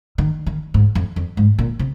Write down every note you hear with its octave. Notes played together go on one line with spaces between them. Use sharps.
D#3
D#3
G#2
F2
F2
G#2
A#2
C3